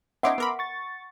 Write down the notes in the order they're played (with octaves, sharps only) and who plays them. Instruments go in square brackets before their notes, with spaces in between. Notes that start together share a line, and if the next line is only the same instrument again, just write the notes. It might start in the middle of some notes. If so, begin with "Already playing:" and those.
[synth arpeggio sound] B3 C#4 D#4 [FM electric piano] E5 C6 D6 [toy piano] F#5
[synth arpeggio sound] B3 A#4 B5
[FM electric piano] C#6 A6